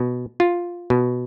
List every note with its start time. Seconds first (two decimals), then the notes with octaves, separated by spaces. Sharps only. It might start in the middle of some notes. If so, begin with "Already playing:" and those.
Already playing: B2
0.40 F4
0.90 B2